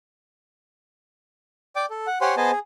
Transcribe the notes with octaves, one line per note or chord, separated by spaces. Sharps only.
D5 G5 D6
A4
F#5
G4 C5 C#5 F#5 G#5 C6
B3 G#4 C5 D#5 G#5 A5
G#4